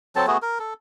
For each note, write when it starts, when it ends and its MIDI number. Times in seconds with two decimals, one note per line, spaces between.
0.16 0.26 54
0.16 0.26 60
0.16 0.26 69
0.16 0.26 81
0.27 0.38 57
0.27 0.38 59
0.27 0.38 66
0.27 0.38 68
0.42 0.58 70
0.59 0.74 69